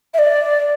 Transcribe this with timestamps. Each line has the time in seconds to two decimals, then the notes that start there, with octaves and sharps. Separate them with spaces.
0.14 E5
0.19 D5